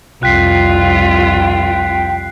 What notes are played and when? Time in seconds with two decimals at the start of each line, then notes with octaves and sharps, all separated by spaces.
0.23 C2 F2 F4 G5 F#6 B6 C7